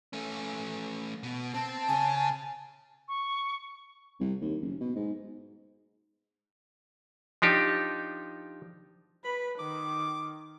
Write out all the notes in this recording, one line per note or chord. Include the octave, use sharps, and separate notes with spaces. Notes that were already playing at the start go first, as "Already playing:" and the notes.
A3 C#4
B2
C4 A5
C#3 C#4 G#5
C#6
C2
D#2
F#1
B2
G#2
F3 D4 D#4 G4
B4 B5
D#3 D6